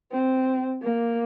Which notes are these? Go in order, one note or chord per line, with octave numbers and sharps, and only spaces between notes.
C4
A#3